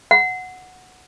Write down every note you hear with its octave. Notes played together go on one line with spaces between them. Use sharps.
F#5